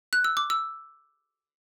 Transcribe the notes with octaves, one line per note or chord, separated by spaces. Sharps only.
F#6
E6
D6
E6